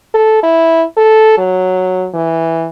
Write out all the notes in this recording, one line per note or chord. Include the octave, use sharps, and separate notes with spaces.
A4
E4
A4
F#3
E3